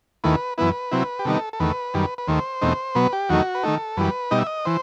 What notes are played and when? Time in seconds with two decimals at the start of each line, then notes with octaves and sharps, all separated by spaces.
0.24 D#2 D#3 A3 E4 B4
0.58 F#2 E3 B3 E4 B4
0.92 C3 F#3 C4 E4
1.19 G4
1.25 C3 D#3 G3 B3 D#4 A4
1.53 A4
1.60 E2 D#3 A3 B4
1.94 F#2 D#3 G3
2.18 B4
2.27 D#2 D#3 A3 C5
2.62 E2 B2 A3 C4 D#4
2.95 B2 F#3 B3 B4
3.13 G4
3.29 E2 D#3 F#3 A3 D#4 F#4
3.55 B4
3.63 D#3 A3 D#4 A4
3.97 F#2 E3 G3 B4
4.31 B2 G3 D#4 D#5
4.39 E5
4.47 D#5
4.65 E3 C5